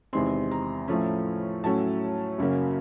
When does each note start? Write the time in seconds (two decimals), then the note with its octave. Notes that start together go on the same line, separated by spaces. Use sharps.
0.13 E2 C3 D#3 G#3 C4 C6
0.51 A#5
0.88 A2 F3 A3 C#4
1.63 A2 F#3 A3 C#4 A5
2.38 F#2 C#3 F#3 A#3 C#4